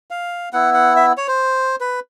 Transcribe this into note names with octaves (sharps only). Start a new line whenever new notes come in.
F5
B3 E4 F#5
F#5
E5
C#5
C5
B4